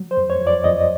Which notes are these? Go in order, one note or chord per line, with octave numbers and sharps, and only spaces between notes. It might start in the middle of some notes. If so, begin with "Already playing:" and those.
Already playing: F#3
C5
F2
C#5
F2
D5
F2 D#5